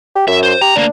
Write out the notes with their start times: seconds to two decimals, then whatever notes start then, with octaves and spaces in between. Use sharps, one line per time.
0.16 G4
0.28 F#2 E5
0.43 C5
0.61 G4 A#5
0.76 D2 A#3 D4